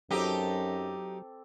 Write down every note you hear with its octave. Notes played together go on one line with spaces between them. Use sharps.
F#2 F#3 C4 D#4 G4 A4 D5